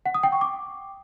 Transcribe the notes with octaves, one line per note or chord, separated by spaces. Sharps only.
F#5
D#6
G5
C#6
D6